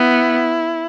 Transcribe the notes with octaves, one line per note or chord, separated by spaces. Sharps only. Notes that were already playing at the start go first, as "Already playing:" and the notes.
Already playing: B3 E4